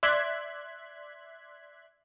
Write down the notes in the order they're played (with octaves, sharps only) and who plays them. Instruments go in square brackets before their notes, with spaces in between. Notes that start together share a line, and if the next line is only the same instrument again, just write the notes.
[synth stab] D5 E5 C6 F#6 G#6 B6